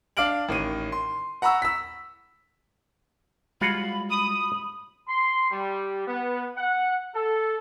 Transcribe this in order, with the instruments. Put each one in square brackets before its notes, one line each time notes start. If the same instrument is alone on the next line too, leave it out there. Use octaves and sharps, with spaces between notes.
[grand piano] D4 F5 D6 F6 D7 F#7
A1 D#3 C#5 D#7
C6
F#5 A#5 B5 C#6 E6
E6 B6
[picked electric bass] G3 G#3 [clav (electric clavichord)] F4 F#4 C#5 [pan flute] B5
[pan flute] B5 [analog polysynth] D#6
[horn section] C6
G3
B3
F#5
A4